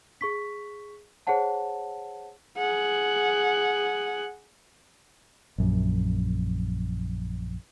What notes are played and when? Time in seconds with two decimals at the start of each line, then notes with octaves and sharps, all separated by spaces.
0.21 G#4 C#6 B6
1.27 G#4 C5 C#5 F#5 A5
2.58 G#4 F#5
5.58 A#1 F#2